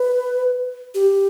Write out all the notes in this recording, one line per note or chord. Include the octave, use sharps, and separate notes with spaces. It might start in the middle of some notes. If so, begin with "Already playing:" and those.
Already playing: B4
G4